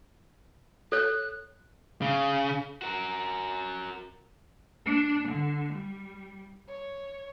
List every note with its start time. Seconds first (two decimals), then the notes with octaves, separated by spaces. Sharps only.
0.92 A4 C#5 F#6
2.02 C#3
2.82 F#4 A#4
4.86 D4
5.29 D3
5.73 G3
6.70 C#5